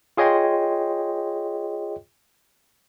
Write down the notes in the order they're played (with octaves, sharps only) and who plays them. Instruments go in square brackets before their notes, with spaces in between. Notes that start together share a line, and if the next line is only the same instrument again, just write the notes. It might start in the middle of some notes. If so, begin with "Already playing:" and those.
[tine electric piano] F4 G#4 C#5 D#5 G5 C6